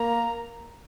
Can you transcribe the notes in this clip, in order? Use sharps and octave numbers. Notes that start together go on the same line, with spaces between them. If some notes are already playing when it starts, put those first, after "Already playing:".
Already playing: A#3 A#5